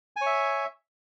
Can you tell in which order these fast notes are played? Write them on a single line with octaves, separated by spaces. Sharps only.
G#5 C#5 E5